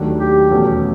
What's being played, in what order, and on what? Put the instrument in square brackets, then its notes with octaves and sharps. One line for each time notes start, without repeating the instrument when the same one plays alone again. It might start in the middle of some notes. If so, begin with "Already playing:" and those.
Already playing: [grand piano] D#2 D#3 F#3 A3 D4
[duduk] G4
[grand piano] E2 B2 F#3 A3 C#4